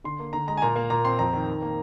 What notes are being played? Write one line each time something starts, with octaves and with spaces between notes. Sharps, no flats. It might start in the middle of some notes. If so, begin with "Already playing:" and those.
D3 C6
A#3
D3 A#5
G#3 A#5
G#5
A#2 A#5
A#3
A#2 A#5
C4 C6
F2 A#5
D#3
D#3
A#3